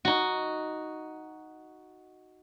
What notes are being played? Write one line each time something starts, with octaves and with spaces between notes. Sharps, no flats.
D#4 F#4